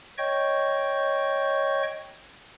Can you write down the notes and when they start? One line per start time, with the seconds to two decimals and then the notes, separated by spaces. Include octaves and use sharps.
0.18 C#5 D#5 G5 C#6 G6